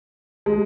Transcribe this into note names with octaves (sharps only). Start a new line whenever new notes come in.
G#3